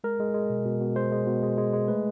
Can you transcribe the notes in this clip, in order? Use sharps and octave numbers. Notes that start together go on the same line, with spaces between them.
G#3 A#4
G#3
G#3
B2
B2
B2
G#3 C5
G#3
B2
G#3
G#3
G#3
A3 B4